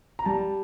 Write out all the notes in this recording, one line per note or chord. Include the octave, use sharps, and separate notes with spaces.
A#5
G3 A5